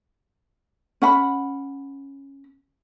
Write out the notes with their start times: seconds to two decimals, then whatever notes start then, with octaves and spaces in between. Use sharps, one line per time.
1.02 C#4 F#5 B5